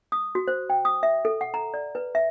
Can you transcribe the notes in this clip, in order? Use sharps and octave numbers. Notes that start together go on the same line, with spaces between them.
D#6
F#4
C5
G5
D#6
E5
A4
F#5
A#5
D5
B4
E5